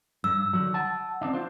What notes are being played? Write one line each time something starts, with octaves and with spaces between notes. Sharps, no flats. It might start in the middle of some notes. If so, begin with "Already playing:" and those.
G2 E6
D3 D#3 F#3
F#5 A5
C4 D4 D#4
D4 F4 C5